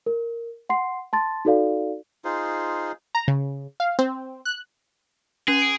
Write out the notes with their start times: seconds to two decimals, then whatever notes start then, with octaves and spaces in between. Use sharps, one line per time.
0.06 A#4
0.69 F#5 C6 C7
1.13 A5 C6 A6
1.45 D#4 F#4 A4 D5 F5
2.25 D#4 F4 G#4 C5
3.15 A#5
3.28 C#3
3.80 F5
3.99 C4
4.45 F#6
5.48 C#4 G#4
5.62 D7